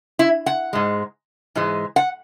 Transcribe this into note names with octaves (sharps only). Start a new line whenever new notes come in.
E4
F#5
G#2 G#3
G#2 E3 G#3
F#5